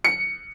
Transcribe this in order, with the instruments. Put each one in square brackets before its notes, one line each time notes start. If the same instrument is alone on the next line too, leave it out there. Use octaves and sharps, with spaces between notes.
[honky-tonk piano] C#7